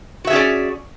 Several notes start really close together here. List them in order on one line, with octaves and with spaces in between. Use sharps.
F#4 E5 G#4 C#4 D5